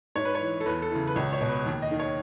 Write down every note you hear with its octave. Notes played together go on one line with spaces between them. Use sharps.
G#2 C#5
B4
C#5
E3
A4
E2 B4
A4
C#3 E3
B4
C#2 C#5
C#5
B2
B4
D#2
D#5
D#3
C#5